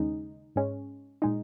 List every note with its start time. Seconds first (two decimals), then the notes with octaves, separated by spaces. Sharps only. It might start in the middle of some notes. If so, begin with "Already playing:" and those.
Already playing: D#2 C#3 G#3 D#4
0.56 G#2 G#3 C#4
1.22 A#2 G#3 D#4